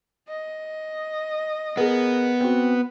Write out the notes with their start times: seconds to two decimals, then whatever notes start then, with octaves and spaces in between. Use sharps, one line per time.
0.28 D#5
1.77 B3 G#4 A#4
2.40 C4 F#4